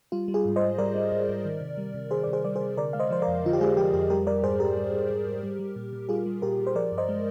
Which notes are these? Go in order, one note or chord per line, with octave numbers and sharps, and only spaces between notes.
G3 F4
G3
F4 G#4
G#2
C5 D#5
G#2
G3 A#4 D5
G3
G#2
G#2
D#3
C3
G3
C3
D#3 G#4 C5
C3 D5
G#4 C5
G3 D5
G#4 C5
C3
D3 A#4 D5
G#3 F5
C5 D#5
F3 C5
A#4 D5
F2
D3 F4
G4
G#3 F4 G#4
F3 G4
F2 G4
G3 G4 A#4
G3 A#4 D5
G#2 G#4 C5
G#2 G4 A#4
G3
G3
G#2
G#2
G3
G3
A#2
A#2
G3 F4 G#4
G3
A#2 G4 A#4
A#2
C5
F3 A#4 D5
G2
C5 D#5
G#3